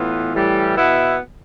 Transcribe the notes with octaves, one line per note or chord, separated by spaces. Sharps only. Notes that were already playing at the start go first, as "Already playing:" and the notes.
Already playing: A2 E3 B3 F4
A2 E3 G3
B2 B3 E4